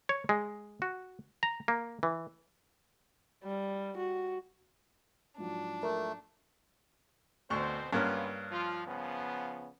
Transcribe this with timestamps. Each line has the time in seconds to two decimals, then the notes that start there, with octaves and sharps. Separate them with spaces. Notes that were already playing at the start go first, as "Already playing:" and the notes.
0.09 C#5
0.29 G#3
0.82 F#4
1.43 A#5
1.68 A#3
2.03 E3
3.44 G3
3.97 F#4
5.38 G#2 F3 F#3 D4
5.83 A3 A#4
7.50 D2 B2 C4 C5 C#6
7.93 C#2 G2 A#3 B3 C#4 F4
8.50 F3 F4
8.86 C#3 F3 B3